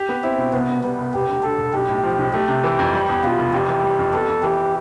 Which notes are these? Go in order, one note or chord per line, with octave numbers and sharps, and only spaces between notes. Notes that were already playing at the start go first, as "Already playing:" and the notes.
Already playing: G4
B3
C4 E4
B2
C2 B3
B2
G3 B3
C2
E1 G4
D2
D3 A4
E1
B1 G4
A2
F3
B1
A3 G4
C3
E3
F2
G3
E2
B2 F4
F1
F2 G4
E3
G3
F2
B3 A4
F2
E3 G4